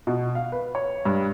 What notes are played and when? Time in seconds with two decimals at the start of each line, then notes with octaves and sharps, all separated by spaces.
0.07 B2
0.35 F5
0.52 B4
0.75 C#5
1.05 G2